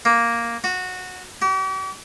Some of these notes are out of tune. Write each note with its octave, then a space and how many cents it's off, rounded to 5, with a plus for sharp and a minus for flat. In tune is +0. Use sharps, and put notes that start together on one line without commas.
A#3 +0
F#4 -15
G4 -45